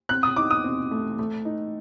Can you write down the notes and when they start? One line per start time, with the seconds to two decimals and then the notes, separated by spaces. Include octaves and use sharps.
0.09 C4 F#6
0.23 D#6
0.36 D#4 D6
0.51 D#6
0.64 C4
0.91 A3
1.19 A3
1.45 D#4